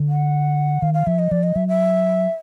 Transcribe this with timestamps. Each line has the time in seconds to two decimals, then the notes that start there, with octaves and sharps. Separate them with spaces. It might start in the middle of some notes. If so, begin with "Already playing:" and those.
Already playing: D3
0.09 F#5
0.82 D#3 F5
0.94 F5
1.07 F3 E5
1.19 D#5
1.31 F3 D5
1.43 D#5
1.56 F#3 E5
1.68 E5